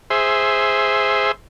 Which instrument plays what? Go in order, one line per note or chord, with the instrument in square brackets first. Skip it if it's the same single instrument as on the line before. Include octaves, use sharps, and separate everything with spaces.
[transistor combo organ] G#4 C5 E5